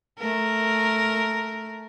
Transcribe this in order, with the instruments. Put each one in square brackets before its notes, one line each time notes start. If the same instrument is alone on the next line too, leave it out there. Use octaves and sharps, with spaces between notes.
[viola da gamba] A3 A#4